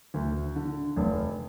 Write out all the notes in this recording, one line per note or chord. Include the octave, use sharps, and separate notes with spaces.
D2
D3
F1